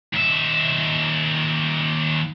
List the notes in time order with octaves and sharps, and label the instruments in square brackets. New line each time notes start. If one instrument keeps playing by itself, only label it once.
[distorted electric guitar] D#2 E5